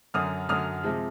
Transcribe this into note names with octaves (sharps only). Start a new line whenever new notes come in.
F#2 D3 F#3 D#6 F6
F#2 D3 F#3 D#6 F6
C3 F3 G#3